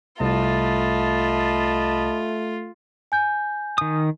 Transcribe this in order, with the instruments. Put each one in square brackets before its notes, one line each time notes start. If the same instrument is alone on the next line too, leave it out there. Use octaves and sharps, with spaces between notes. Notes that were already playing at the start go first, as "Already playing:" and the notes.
[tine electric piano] C2 [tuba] A3 [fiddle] F4 [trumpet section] D#5 A5 B5
[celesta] G#5 G6
[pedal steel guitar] D#3 D#6